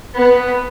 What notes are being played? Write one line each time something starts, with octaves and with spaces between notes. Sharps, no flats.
B3